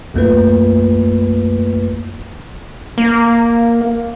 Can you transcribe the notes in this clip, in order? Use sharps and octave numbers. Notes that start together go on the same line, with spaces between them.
B1 F#2 A3 A#3 F4 B4
A#3